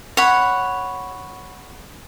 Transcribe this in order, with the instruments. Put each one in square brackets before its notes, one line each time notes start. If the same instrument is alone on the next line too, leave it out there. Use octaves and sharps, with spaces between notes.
[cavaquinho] C#5 F#5 B5